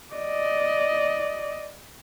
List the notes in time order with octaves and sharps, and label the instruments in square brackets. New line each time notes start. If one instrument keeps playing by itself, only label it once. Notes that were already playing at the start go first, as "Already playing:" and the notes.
[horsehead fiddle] D5 D#5